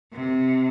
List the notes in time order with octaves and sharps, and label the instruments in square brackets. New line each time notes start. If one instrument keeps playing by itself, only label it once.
[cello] C3